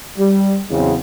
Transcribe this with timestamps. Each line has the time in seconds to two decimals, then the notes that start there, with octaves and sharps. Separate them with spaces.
0.18 G3
0.69 E2 C#3 F#3 G#3 C4